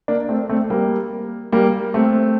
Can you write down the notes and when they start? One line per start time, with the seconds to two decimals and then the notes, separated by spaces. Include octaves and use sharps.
0.08 A#3 D4
0.29 A3 C4
0.49 A3 C4
0.70 G3 A#3
1.52 G3 A#3
1.94 A3 C4